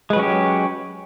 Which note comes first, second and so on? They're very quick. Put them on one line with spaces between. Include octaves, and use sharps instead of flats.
G#3 B4 F#3 C#4 G4